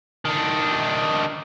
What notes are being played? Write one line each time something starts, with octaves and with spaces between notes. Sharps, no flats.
D#3 D4